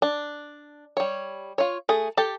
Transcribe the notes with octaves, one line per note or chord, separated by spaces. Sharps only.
D4
G3 C#5
F4 C#5
A3 G#4
G4 A4 A5